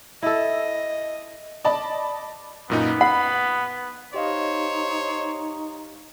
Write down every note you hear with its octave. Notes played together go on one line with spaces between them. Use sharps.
E4 A4 D#5
D5 D#5 A5 B5
F#2 A#2 B3 D#4
F#5 B5
D#4 G4 C5 C#5 D#5 F5